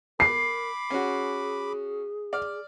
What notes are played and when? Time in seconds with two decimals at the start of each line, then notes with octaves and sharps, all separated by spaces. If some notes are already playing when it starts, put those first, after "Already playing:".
0.20 A#4 B5 D6 C7
0.90 C#4 F#4 G#4
2.33 D5 F6